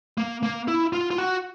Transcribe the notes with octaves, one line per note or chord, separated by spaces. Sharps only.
A#3
A#3
E4
F4
F4
F#4